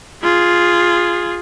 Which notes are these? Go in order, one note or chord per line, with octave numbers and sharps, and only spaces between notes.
F4 G#4